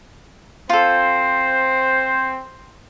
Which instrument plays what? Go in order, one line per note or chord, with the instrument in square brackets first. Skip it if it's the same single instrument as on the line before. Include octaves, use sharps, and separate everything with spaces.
[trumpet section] C4 C5 [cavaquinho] F4 A4